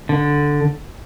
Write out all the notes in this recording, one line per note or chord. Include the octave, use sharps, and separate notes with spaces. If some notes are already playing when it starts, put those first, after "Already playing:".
D3